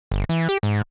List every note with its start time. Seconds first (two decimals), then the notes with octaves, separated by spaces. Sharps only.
0.11 G1
0.29 E3
0.49 G4
0.63 G#2